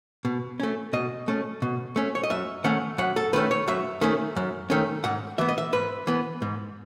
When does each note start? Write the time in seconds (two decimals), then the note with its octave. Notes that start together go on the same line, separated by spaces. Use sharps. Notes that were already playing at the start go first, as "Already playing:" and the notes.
0.25 B2
0.60 A3 C#4
0.93 B2 D#5
1.28 A3 C#4
1.62 B2
1.96 A3 C#4
2.15 C#5
2.23 D#5
2.30 F#2 E5
2.64 D#3 A3 C#4 F#5
2.98 F#2 F#5
3.16 A4
3.33 D#3 A3 C#4 B4
3.51 C#5
3.68 F#2 E5
4.01 D#3 A3 C#4
4.36 F#2
4.70 D#3 A3 C#4
5.04 G#2 F#5
5.38 E3 B3 E5
5.49 D#5
5.58 E5
5.73 G#2 B4
6.07 E3 B3
6.42 G#2